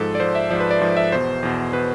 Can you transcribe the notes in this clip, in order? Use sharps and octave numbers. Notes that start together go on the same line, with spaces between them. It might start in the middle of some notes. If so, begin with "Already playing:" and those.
Already playing: G#2 F3 A4
D5
G#2 F3 C5
E5
G#2 F3 D5
B4
D5
G#2 F3
E5
E2 B2 C5
E2 B2
B2 B4